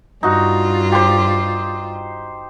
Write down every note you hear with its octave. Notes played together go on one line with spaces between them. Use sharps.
G2 D#4 F4 F#4
G4 C5